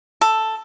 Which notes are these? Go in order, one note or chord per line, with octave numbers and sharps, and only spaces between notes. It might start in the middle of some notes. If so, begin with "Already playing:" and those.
A4